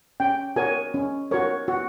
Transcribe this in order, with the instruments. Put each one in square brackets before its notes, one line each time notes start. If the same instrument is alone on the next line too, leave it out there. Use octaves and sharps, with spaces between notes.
[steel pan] C#4 G5
F#4 A#4 C#5 G#5
C#4
F#4 A#4 C#5
F#4